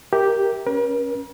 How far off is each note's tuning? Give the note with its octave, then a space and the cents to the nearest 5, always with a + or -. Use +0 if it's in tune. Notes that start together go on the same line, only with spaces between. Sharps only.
G4 +0 A#4 +0 E5 -20
C#4 +0 A#4 +45